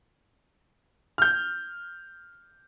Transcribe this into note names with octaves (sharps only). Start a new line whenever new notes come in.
F6 G6